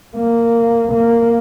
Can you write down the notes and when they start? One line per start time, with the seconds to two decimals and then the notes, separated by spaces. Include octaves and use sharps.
0.16 A#3
0.93 A#3